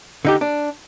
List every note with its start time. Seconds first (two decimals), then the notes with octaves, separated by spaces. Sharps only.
0.25 D3 D#4 G4
0.41 D4